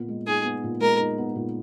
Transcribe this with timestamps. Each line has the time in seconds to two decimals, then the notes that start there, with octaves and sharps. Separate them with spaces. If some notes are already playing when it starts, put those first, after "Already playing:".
Already playing: A#2 B3
0.08 G#3
0.27 D#4 G#4
0.45 B3
0.64 A#2
0.81 G#3 A#4
1.00 D#4
1.18 B3
1.35 A#2